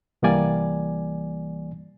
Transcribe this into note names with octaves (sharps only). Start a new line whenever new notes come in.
C2 E3 G3 A#3 D5 G#5